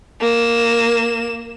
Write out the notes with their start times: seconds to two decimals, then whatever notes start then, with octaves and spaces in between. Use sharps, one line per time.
0.21 A#3 E7